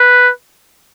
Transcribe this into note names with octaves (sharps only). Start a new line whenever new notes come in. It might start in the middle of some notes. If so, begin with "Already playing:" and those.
Already playing: B4